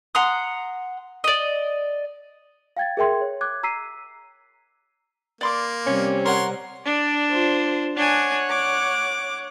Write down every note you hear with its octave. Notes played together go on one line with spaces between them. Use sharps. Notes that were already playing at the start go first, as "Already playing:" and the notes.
F#5 A#5 C6 D#6
D5 D#5
F5 G5 G#6 A6
G#4 A#4 E5 G5 C6 G#6
C#5
D6 F#6 G#6
A#5 E6 B6 C7 D#7
A#3 D5 C6 D6
C3 G3 C4 C#4
A#4 C#5 F#5 C6
D4 D5
F4 C5
D4 C#5 F#5 G#5
D6